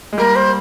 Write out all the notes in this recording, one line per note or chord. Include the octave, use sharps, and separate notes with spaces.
G#3
G3 A#3 A#4
C5